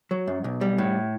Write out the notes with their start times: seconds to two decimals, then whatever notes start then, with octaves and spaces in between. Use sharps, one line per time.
0.11 F#3
0.27 F#2
0.44 B1
0.61 G3
0.78 A2